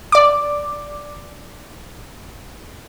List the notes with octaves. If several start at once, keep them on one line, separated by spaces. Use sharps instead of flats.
D5 D6